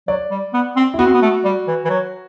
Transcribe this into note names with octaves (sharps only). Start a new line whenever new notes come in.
F#3 D5
G3
B3
C4
E4
B3 F#4
C4
B3
A3
G3
E3
E3
F#3